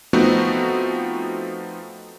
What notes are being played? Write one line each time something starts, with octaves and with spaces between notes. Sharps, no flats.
F3 A3 B3 C4 D#4 F#4